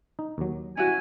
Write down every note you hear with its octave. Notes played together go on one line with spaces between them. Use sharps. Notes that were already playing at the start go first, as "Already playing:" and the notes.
D#4
D#2 F#3
C#4 E4 F#4 G#5